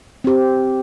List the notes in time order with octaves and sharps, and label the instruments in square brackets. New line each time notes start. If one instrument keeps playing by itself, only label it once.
[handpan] C4 G4